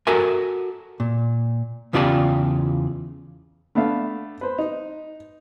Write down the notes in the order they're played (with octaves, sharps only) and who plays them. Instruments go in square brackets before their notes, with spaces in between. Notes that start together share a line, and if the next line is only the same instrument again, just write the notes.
[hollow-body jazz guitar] F#4 A4 A#4 E5 G#5
A#2
E2 C#3 F4 G4 D5 A5
[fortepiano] A3 B3 D4 E5 F5
B4 C5
D#4